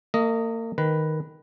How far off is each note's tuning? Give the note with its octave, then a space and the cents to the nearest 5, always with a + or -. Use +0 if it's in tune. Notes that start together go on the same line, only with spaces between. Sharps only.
A#3 -40 D#5 +0
D#3 +0 B4 +0